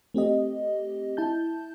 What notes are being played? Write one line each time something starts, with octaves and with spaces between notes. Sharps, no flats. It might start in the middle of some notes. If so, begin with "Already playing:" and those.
A3 C4 G4 D#5
E4 A5 G6